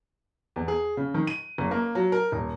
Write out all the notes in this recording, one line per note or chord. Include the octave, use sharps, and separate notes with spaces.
E2
G#4
C#3
D#3
D#7
F#1
A#3
F#3
A#4
D#1